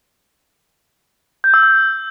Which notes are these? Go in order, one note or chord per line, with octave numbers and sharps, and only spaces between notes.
G6
E6
G6